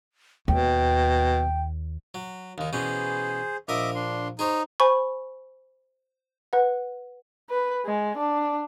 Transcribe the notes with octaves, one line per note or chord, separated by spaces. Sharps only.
D#2 B2 G5
F#3
D#2 D#3
B2 E3 C#4 G#4 C5
A#1 A#4 D#5 E5 D6 D#6
D4 C6
D#4 G#4 C5 C#5
C5 G#5 B5 C#6
B4 F#5
B4
G#3
D4